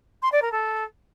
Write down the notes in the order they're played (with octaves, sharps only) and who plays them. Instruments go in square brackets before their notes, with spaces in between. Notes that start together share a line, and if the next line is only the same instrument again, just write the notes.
[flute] C6
D5
A#4
A4